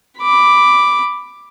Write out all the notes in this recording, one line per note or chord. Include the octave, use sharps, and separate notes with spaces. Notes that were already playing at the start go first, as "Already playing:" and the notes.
B5 D6